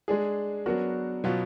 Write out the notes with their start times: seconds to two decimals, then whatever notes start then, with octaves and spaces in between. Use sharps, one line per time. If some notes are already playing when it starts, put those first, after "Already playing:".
0.08 G#3 D4 G#4
0.66 F#3 B3 D4 F#4 A#4
1.24 B2 F#3 B3 F4